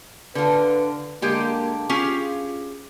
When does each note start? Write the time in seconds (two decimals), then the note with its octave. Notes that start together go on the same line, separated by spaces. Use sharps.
0.35 D3 F4 B4
1.22 D3 G#3 A#3 G4
1.89 C#4 F4 G4 G#4